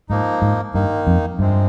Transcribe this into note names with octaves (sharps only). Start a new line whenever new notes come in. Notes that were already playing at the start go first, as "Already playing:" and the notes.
G#2 F3 A#3 D#4
G#2
G2 D#3 A#3 D#4
F2
G2 C3 F3 G#3 C4